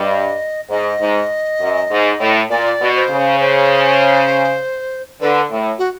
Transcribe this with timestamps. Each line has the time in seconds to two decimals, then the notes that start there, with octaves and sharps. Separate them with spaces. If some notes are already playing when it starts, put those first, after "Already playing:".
Already playing: G2 D#5
0.70 G#2 D#5
1.00 G#2
1.60 F#2
1.91 G#2
2.20 A2
2.50 A#2 D5
2.81 B2
2.95 C5
3.10 C#3
3.40 C5
5.21 D3 B4
5.51 A2
5.78 F#4